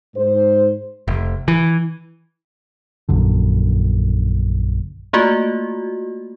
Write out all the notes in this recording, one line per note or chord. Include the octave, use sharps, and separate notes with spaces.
G#2 C5
F1
E3
A#1 F#2 D3
A3 A#3 F4 F#4